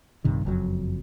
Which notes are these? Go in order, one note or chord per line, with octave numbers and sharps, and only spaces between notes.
A#1 G2 C3 D#3
F#1 F2 F#3